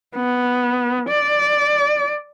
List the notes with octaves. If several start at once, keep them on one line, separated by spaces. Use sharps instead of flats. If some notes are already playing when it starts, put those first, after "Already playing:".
B3
D5